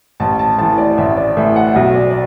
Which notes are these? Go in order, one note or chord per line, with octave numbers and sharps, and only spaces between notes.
A1 A5
A5
A2 E3 A5
D5
A1 E5
D5
A2 E3 E5
F#5
B1 E5
D5
D5